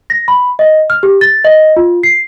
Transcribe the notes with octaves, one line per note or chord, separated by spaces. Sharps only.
A#6
B5
D#5
F6
G4
A6
D#5
F4
C7